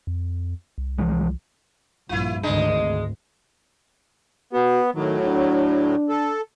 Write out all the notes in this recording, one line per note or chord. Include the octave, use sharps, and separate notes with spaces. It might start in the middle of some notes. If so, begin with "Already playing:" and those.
F2
C2
E3 F3 G#3
A#1 G2 E4 F4
G#1 D2 G#3 D4 D#5
B3 F#4
A2 D#3 F#3
D4
A4